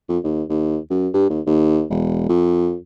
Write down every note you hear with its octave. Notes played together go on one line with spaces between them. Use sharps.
F2
D#2
D#2
F#2
G2
D#2
D#2
E1
F2